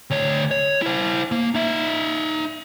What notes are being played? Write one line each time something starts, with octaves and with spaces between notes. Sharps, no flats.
D2 C#5
C#5
E4 C5
A#3
D#4 E5